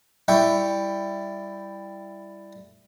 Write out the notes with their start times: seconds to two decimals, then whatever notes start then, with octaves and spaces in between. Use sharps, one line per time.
0.28 G3 E4 G5 C#6